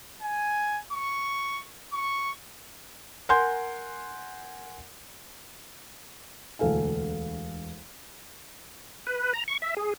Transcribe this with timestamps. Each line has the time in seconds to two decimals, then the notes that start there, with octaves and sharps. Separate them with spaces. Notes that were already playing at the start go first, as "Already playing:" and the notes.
0.22 G#5
0.93 C#6
1.93 C#6
3.29 A#4 F#5 G#5 C6 G6
6.59 E1 D2 A4 F5 G#5
9.07 B4
9.34 A#5
9.48 C#6
9.62 E5
9.77 G#4